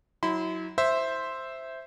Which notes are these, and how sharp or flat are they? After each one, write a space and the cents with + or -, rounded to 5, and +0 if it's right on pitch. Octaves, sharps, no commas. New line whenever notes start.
F#3 +0 E4 -30 C6 -40
C5 +0 E5 +0